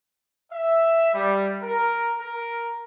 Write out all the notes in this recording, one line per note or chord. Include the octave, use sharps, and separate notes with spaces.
E5
G3
A#4
A#4